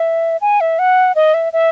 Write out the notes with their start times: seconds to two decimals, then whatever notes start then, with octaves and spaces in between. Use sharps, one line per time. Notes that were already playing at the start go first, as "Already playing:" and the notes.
Already playing: E5
0.41 G#5
0.61 E5
0.79 F#5
1.15 D#5
1.34 E5
1.53 E5